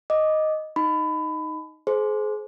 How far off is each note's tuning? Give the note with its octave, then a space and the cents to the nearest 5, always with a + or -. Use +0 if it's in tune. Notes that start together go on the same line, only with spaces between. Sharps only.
D#5 +0 D6 +0
D#4 +0 B5 +25
G#4 +35 C5 +0